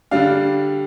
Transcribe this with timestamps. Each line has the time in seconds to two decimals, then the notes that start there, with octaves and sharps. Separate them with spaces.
0.11 D3 G3 D4 F5